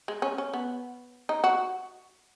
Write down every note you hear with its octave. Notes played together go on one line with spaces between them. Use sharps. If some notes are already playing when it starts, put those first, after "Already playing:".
G#3
C#4
C#4
B3
D#4
F#4